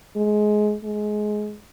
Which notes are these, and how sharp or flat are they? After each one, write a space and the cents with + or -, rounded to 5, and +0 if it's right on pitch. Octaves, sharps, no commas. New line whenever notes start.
G#3 +20
G#3 +20